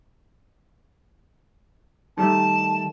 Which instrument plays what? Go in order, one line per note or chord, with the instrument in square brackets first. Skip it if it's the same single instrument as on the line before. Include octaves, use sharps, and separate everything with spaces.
[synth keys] D#3 G3 A3 [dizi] A5